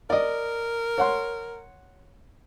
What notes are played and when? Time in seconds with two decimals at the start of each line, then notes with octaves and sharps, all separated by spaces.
0.10 A#4 D5 D#5
0.98 C#5 F#5 C6